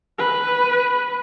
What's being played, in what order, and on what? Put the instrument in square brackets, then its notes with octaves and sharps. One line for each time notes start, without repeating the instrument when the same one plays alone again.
[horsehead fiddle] B4